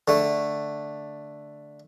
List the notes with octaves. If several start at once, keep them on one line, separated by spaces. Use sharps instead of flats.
D3 A3